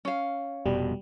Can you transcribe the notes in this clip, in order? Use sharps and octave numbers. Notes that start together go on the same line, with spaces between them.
C#4 F5
F1 B2 G3